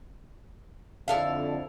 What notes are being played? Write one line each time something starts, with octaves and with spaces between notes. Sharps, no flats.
F2 D3 E4 A4 F5